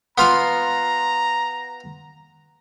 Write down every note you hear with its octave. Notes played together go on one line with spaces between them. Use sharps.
B3 F4 F5 A#5